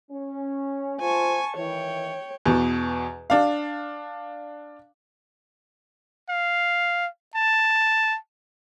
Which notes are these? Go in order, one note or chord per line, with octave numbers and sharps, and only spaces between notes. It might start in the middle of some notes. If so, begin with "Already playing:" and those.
C#4
F4 C5 G#5 A5 C#6
D#3 E3 C#5 G5
E2 B2
D4 F5
F5
A5